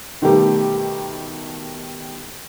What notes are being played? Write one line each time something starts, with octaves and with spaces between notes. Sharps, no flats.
B2 D#3 G3 A3 G4 A#4